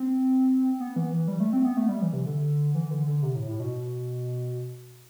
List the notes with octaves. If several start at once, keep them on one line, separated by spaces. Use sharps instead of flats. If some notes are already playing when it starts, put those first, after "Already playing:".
Already playing: C4
B3
E3
E3
G3
A3
C4
B3
A3
G3
E3
C3
D3
E3
D3
D3
C3
A2
A2
B2